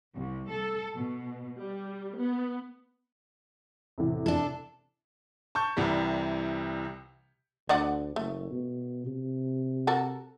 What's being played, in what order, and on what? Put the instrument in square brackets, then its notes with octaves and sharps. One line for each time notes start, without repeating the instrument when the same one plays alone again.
[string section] C2
A4
B2
G3
B3
[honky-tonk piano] E2 A2 C3
[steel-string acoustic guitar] D4 A4
[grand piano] A5 C#6 G6
C2 C3 E3 G3
[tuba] D2 [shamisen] D3 D5 F#5
[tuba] F#1 [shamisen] A3
[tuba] B2
C3
[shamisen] F#4 A4 A#4